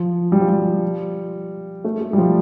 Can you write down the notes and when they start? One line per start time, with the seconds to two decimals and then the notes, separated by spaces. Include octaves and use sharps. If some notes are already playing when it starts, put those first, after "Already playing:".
Already playing: F3
0.32 G3
0.40 F3
0.49 G3
1.84 A3
2.01 A3
2.13 G3
2.18 F3